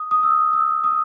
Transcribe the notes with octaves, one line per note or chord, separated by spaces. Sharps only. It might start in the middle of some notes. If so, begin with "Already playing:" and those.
Already playing: D#6
D#6
E6
E6
D#6